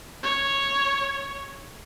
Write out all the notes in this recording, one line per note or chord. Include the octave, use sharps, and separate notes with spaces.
C#5